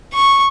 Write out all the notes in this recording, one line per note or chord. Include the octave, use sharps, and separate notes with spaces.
C#6